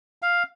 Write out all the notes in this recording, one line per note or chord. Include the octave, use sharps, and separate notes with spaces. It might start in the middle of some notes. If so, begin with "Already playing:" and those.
F5